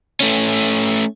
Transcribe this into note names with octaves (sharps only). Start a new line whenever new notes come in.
A3 C#4